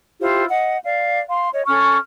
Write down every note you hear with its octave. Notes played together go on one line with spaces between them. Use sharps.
E4 F4 G4 C5
D#5 F#5
D5 F5
F5 C6
C#5 D#5
C#4 A4 C#6 F6